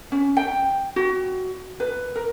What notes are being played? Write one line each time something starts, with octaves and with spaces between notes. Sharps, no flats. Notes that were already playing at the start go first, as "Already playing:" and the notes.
C#4
G5
F#4
B4
A#4